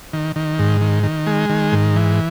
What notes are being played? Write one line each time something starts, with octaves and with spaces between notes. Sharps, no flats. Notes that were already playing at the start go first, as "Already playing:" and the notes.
D#3
D#3
G#2
D#3
D#3
G#3
D#3
G#2
E3